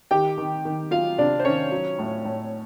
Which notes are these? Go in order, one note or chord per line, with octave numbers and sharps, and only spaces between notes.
D#3 G4 G5
D#3
D#3
F#3 F4 F5
C3 D4 D5
C5
D#3 C#4 C#5
F#3
A2
A2